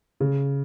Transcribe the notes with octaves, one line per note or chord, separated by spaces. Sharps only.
C#3